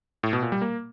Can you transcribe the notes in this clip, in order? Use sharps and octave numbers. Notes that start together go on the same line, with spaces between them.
A2
B2
A#2
G3
A#3